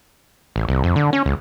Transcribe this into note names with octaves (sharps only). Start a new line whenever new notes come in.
A1
C2
F2
D3
C#4
C#2